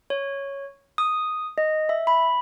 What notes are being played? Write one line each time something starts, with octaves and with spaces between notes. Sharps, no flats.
C#5
D#6
D#5
E5
B5